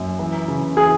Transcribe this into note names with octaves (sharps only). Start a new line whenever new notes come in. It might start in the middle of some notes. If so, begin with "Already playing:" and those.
Already playing: F#2
E3
C#3
E3 G#4